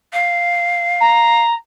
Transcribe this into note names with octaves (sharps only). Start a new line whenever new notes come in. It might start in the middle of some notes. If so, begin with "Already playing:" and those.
F5
A#5